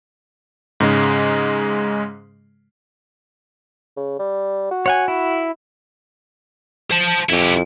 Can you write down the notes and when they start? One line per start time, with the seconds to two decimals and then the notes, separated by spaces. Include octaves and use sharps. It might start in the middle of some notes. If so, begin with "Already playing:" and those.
0.80 G#2 C#3 G#3
3.97 C#3
4.19 G3
4.71 F#4
4.86 C#5 F#5 G#5
5.08 E4
6.91 C5 A5
7.29 F2 E4 G4